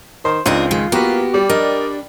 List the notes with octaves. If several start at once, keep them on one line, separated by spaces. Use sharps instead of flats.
D#3 C5
C#2 C4 D4 D#4 F4 A#4
D#3 G#3
A#3 B3 F#4 G4 B4
G3 D5
D4 A#4 D#5